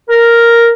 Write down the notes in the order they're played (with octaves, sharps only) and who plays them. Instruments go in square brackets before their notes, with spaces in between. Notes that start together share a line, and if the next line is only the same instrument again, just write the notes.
[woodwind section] A#4